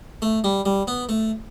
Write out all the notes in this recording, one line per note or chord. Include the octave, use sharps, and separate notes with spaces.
A3
G3
G3
B3
A3